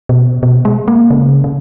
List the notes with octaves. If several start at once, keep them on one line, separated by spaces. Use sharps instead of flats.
B2
B2
G#3
A#3
C#3
C#3